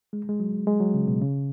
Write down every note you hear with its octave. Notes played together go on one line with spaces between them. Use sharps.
G#3
G#3
F#3
G#3
F#3
C#3
B2
C#3